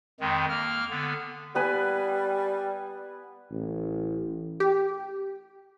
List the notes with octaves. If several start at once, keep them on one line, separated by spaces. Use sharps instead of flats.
F2 D#3 G#3
A#3 F6
D3 B3
G3 B3 B4 G#5
A1
G4